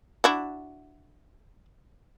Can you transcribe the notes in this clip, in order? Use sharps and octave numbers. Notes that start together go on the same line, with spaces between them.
D4 E4 F#4